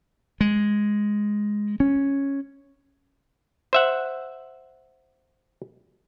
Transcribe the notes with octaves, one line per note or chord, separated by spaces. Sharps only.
G#3
C#4
C5 E5 F#5